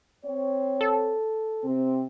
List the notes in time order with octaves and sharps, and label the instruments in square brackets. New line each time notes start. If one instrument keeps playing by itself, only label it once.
[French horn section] C4 C#5
[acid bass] A4
[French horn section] C3 C4